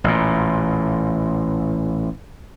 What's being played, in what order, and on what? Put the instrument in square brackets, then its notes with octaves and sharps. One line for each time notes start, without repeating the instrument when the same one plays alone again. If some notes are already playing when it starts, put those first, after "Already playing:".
[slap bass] A1 A#2